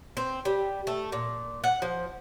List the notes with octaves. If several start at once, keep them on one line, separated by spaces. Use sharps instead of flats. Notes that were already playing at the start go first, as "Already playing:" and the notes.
C4
G3
A3
A#2
F#5
F3